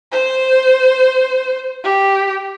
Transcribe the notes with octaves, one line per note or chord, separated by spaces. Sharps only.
C5
G4